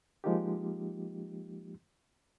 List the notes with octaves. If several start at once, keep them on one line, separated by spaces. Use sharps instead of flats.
F3 G#3 A#3 D#4 F4 G4